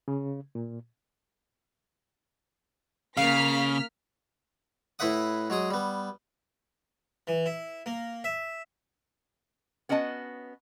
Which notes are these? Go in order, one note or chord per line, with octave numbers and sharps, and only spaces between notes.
C#3
A#2
C#3 A#3 F5 F6 B6
A2 E4 B4 E5 F#5 D#6
F#3 G#3 G#4 D#6
G3 B3
E3
E4
A#3
E5
B3 C#4 F#4 D#5 A5